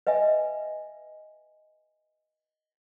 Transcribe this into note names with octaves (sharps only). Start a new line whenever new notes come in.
B4 D#5 E5 G#5